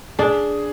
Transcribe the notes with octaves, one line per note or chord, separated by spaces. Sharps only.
D4 G#4